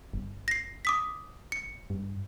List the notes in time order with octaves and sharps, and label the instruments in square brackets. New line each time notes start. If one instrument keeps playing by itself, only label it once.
[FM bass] G1
[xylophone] A#6 C7
D6 D#6 B6
C#7
[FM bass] G2